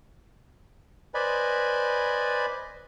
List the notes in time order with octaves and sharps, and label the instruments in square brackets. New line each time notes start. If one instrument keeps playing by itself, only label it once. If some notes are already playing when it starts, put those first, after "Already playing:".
[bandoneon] B4 C5 D5 D#5 G#5 B5